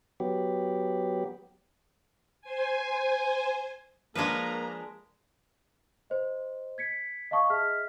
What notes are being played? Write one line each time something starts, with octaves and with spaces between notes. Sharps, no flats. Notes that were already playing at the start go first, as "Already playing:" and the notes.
F#3 B3 G4
C5 G#5
F3 G#3 A#3 D4 A#4 B4 A#5
C5 D#5
G#6 B6 C#7
D#5 F5 A5 C#6 D#6
G#4 D#5 E5 F6 B6